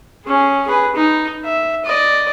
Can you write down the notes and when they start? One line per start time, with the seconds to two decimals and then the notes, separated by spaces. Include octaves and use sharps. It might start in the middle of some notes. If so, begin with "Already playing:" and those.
0.26 C#4 G#4
0.67 G#4 B4
0.96 D#4
1.44 E5
1.85 D5 D#5